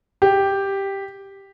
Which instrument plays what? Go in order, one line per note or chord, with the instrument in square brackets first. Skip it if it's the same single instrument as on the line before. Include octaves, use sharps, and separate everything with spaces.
[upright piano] G4